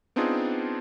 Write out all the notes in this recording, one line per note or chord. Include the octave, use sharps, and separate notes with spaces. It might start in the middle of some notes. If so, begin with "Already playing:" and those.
B3 C4 D4 D#4 F4 G#4